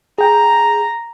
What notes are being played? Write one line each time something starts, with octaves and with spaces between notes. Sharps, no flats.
G#4 G5 A#5